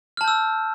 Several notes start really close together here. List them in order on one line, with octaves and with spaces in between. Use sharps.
F6 A5 G6 E6